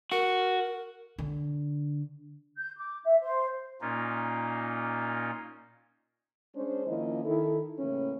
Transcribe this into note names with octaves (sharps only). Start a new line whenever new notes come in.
F#4 A#4
D3
G6
D6
E5
C5
A#2 A#3 C#4 D#4 F4
G#3 C#4 D4 C5
D#3 F3 A#3 C#4 E4 D#5
D#3 E4 A4
A2 C#3 E3 A#3 C#4